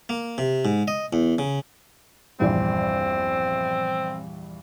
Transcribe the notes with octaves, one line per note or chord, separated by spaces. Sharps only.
A#3
C3
G#2
D#5
E2
C#3
A#1 E2 G2 C4